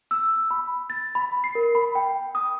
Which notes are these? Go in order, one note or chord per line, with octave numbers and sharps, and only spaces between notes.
E6
B5
A6
B5
C7
A#4
B5
G5
D#6